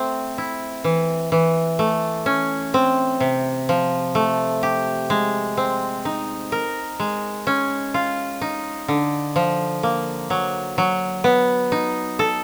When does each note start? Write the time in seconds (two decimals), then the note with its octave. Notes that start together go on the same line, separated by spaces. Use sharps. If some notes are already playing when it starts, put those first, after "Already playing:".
Already playing: A3 C4
0.38 E4
0.84 E3
1.32 E3
1.79 A3
2.26 C#4
2.74 C4
3.20 C3
3.69 F3
4.15 A3
4.63 G4
5.10 G#3
5.57 C4
6.05 D#4
6.52 A#4
6.99 G#3
7.47 C#4
7.94 F4
8.41 D#4
8.88 D3
9.36 F3
9.83 A#3
10.30 F#3
10.78 F#3
11.24 B3
11.72 D#4
12.19 A4